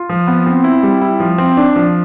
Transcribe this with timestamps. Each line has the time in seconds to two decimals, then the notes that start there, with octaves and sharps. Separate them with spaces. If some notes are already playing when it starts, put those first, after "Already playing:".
Already playing: F4
0.09 F3
0.27 B3
0.46 C4
0.64 E4
0.83 G3
1.02 E4
1.20 F3
1.38 C4
1.57 D4
1.76 F3